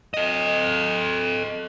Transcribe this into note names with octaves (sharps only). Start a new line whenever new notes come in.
A4 D#5